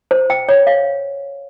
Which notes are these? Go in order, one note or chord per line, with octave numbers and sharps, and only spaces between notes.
C5
G5
C#5
F5